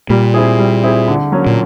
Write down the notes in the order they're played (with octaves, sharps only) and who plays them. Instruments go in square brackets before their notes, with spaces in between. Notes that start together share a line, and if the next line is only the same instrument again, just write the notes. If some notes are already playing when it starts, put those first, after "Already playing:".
[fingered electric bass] A#2 [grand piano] G3
[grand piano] C4 E4 G#4
G3
C4 E4 G#4
D3
F#3 A#3 C#4
[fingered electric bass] A#2